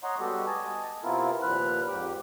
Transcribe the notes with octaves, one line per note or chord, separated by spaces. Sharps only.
C#5 D#5 F#5 A#5 C6
G3 G#3 B3 F#4 G4 A4
D#5 G#5 A5
C3 B3 C4 E4 F4 A#4
D#2 A#2 F3 B4 F6 F#6
F2 G#2 G4 D6